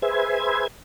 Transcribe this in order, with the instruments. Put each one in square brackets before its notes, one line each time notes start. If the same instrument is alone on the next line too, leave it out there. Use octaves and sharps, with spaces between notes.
[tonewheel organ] G#4 B4 C5 E5 G#6